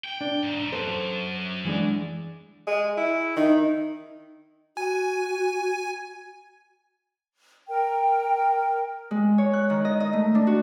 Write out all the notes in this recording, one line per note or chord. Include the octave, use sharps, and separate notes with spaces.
G5
D4
E2 G#2
F#2 A4 C5
E3 G#3 D4
G#3
E4
D#3 D#4
F#4 G#5
A#4 G5
G#3
C#5
F#6
D#3
D#5
D#5
A3
D4
F#4